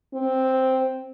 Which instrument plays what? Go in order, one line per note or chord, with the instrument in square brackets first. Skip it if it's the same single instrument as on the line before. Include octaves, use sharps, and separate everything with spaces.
[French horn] C4